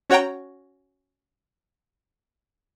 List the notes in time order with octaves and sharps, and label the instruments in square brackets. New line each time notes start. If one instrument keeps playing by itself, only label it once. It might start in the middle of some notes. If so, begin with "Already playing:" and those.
[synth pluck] C#4 F#4 C#5 F#5 G5 A#5